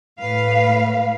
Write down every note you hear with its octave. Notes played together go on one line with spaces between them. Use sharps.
A2 B4 F5